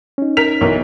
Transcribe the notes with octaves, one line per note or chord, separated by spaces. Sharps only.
C#4 D#4
A#4 B6 F7
B1 E3 A#4